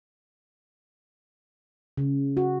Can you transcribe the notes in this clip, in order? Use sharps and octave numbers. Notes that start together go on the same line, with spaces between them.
C#3
F#4